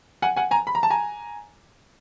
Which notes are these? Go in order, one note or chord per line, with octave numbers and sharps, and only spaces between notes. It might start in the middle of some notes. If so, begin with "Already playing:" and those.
F#5 G#5
F#5 G#5
G#5 A#5
B5
A#5
A5
G#5 A#5